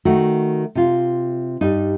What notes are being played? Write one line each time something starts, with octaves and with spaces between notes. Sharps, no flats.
D#3 A3 F#4
C3 F4
G2 G3 D#4